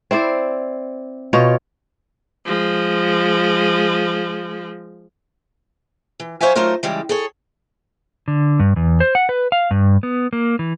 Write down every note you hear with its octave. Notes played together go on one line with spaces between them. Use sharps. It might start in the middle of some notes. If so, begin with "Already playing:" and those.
C4 E4 C5 D5
B2 F4 C#5 G5
F3 G#3
E3
F#3 C5 C#5 E5 F5 G#5
F#3 A3 D#4 F4 A#4 C5
C#3 E3 G3 G#3
G#4 A4 C#5
D3
G2
E2
C5
F#5
B4
F5
G2
B3
A#3
E3